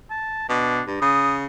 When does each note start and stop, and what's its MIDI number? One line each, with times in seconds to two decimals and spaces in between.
0.10 0.45 81
0.49 0.81 47
0.49 0.83 62
0.87 0.99 43
1.02 1.46 49
1.02 1.34 87